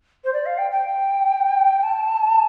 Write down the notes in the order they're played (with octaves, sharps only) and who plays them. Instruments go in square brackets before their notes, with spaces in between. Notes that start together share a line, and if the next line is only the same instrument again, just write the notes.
[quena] C5
D5
F5
G5
G5
A5